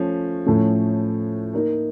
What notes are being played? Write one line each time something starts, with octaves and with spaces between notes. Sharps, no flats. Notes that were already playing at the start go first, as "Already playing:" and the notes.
Already playing: F3 A3 C#4
A2 F3 A3 C#4
A#3 D#4 A#4